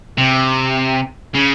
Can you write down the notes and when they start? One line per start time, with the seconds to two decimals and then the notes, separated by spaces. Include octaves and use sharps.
0.18 C3
1.35 C#3